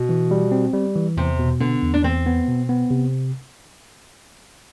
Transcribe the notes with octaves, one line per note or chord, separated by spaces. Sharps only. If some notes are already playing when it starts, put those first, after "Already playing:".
Already playing: B2
E3
G3
C4
G3
E3
E2 C3
B2
D3 B3
E2
D4
E2 C4
B3
B2
B3
C3